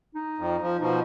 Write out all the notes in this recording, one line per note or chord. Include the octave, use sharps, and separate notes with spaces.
D#4
F2
F3
B2 F3 D#4